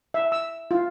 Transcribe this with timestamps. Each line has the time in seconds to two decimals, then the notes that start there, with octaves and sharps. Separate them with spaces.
0.14 E5
0.32 E6
0.71 F4